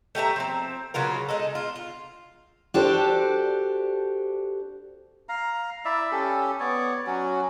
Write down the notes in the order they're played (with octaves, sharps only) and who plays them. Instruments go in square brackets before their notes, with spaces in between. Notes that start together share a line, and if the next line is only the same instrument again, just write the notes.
[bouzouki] A3 G4 E5 A#5
F3 C4
C#3 F#3 F4 A#4
G#3 D#4 A4
F4
F4
[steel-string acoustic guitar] D4 F#4 G4 A4 C5 D5
[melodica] F5 A#5
E4 D5 E5
C#4 G4 A4
B3 C#5 D5
F#3 C#4 F#4